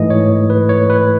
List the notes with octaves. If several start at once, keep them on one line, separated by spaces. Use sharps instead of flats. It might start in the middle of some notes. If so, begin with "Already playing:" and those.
Already playing: G#2 E3 A3 D#5
C#5
B4
C#5
B4